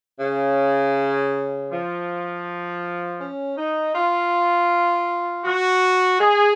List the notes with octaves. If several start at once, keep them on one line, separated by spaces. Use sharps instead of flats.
C#3
F3
C#4
D#4
F4
F#4
G#4